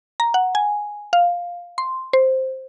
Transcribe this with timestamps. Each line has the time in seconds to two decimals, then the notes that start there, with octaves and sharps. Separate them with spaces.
0.20 A#5
0.34 F#5
0.55 G#5
1.13 F5
1.78 C6
2.13 C5